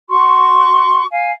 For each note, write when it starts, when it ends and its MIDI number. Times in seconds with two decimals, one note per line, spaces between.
0.08 1.03 66
0.08 1.03 84
0.08 1.03 85
1.10 1.30 77
1.10 1.30 80